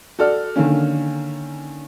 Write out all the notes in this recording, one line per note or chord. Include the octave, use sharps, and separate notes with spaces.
F#4 A4 D5 F6
D3 D#3 A#3 C#4